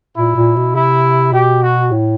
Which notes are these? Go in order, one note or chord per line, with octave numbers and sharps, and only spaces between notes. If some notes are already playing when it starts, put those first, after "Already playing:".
A#2 E4
A#2
B2
C3 E4
B2 G4
F#4
A2